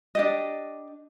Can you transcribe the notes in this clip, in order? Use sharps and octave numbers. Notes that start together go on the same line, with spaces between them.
D4 G4 D#5